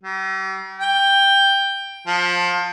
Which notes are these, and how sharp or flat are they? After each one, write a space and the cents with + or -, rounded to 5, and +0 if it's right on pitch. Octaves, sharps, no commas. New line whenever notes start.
G3 -45
G5 +10
F3 +25